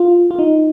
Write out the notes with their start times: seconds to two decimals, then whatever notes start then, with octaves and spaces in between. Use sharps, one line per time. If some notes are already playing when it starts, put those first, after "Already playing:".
Already playing: F4
0.31 F4
0.39 D#4